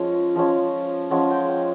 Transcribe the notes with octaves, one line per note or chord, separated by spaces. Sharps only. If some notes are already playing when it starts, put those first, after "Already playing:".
Already playing: F3 G#3 C#4
F3 G#3 C#4
F3 G#3 C#4 F#5
G5
F#5